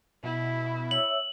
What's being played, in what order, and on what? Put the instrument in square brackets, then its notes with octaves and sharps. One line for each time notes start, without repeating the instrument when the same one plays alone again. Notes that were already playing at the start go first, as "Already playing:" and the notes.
[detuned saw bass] B2 [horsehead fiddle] E4
[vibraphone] C#5 E5 E6 [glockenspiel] F#7